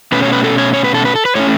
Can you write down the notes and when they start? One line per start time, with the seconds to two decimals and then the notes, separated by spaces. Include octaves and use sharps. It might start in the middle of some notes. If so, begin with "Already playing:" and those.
0.12 B2 A3 C#4 B4
0.23 C#5
0.33 B4
0.44 A4
0.58 C#5
0.74 C#5
0.84 B4
0.94 A4
1.05 B4
1.15 A4
1.25 B4
1.35 A2 A3 C#4 C#5